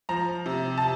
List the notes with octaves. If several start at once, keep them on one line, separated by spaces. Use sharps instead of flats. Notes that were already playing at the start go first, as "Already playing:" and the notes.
F3 A#5
C3
A5